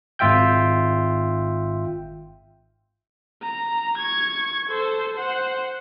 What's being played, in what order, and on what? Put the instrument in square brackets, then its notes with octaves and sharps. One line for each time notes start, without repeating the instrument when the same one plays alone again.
[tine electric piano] G#1 F4 E5 G5 G6
[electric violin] A#5
C#6 G#6
A4 C5
C5 F#5